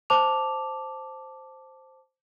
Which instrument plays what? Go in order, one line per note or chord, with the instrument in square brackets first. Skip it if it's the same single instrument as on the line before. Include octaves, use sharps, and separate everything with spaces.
[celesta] C5 A5 D6 F7